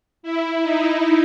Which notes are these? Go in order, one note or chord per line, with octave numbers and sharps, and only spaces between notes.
E4
D#4